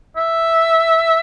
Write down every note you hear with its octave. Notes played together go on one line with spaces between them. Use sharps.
E5